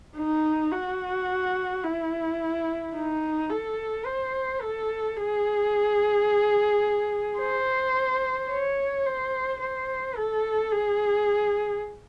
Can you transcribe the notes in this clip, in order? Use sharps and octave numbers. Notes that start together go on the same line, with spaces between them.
D#4
F#4
E4
D#4
A4
C5
A4
G#4
C5
C#5
C5
C5
A4
G#4